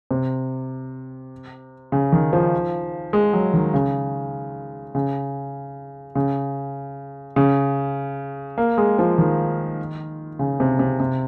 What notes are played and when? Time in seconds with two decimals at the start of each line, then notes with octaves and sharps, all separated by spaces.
0.11 C3
1.92 C#3
2.12 D#3
2.33 F3
3.13 G#3
3.33 F#3
3.54 D#3
3.74 C#3
4.95 C#3
6.15 C#3
7.36 C#3
8.58 A#3
8.78 G#3
8.99 F3
9.18 D#3
10.39 C#3
10.60 C3
10.79 C3
11.00 C3